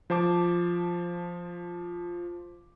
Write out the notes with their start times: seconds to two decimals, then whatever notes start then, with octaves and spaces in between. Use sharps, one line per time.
0.10 F3 C5 A5 D6